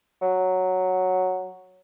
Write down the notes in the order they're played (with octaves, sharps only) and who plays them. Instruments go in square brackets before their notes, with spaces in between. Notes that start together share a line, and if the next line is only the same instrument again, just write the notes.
[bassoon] F#3